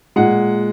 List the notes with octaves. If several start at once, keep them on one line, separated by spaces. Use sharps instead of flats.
A#2 G#3 F#5